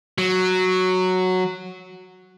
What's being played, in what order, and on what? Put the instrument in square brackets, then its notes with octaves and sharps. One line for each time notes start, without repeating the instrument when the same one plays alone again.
[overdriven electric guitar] F#3